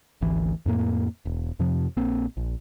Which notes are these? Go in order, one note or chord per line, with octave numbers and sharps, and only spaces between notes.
G#1 D2 E3
F2 A2 A#3
E1
F2 C3 F3
A#1 A#3 C4
A#1